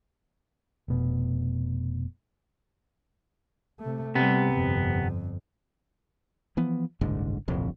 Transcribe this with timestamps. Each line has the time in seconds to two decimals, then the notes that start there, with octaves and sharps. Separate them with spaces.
0.88 F1 B2
3.80 C3 A3
4.15 C3 G3 B3
4.53 G1 F2
6.57 E3 F3 B3
7.01 F#1 C2 G#2 D3
7.48 D1 A#1 F2 C3